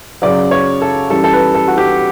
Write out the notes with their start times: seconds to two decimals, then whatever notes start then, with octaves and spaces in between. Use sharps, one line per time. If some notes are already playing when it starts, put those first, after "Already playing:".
0.22 F#2 C#3 F#3 D5
0.51 C#5
0.82 A4
1.10 F#2 E3 G3 A4
1.24 A4
1.33 B4
1.55 A4
1.68 F#4
1.78 G4